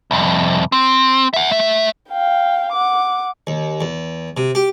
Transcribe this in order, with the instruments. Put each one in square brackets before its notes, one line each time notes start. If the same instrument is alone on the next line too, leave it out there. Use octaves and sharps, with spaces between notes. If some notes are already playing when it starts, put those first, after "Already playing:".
[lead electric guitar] C2 F2
C4
E5 F#5
A3 E5
[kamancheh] F5 G5
F#5 D6
[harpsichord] D#2
E2
C3
G4